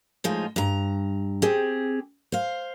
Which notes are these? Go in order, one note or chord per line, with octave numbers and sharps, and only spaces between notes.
A2 F3 G#3 D#4 F4
G2 A#5
C4 G4 G#4
C5 F5